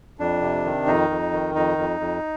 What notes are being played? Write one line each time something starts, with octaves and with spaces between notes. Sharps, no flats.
F2 D4
C3
D#3
F2 D#4
F2
D#3
F2 D#4
F2
F2